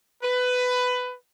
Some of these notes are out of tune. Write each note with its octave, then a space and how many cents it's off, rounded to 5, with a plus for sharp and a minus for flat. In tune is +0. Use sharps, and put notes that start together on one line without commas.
B4 +15